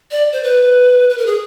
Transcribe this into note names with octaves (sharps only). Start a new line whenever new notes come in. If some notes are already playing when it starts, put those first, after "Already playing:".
D5
C5
B4
B4
A#4
G#4